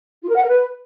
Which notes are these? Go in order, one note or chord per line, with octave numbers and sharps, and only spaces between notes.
F4
A#4
F#5
A#4
B4